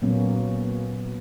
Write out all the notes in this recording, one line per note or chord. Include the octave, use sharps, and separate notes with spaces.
A#2 F#3 A#3 B3 C#4